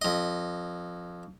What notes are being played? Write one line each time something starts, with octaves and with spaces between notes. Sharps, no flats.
F2 D#5